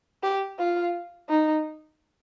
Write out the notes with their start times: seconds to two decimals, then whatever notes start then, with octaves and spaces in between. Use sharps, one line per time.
0.23 G4
0.59 F4
1.29 D#4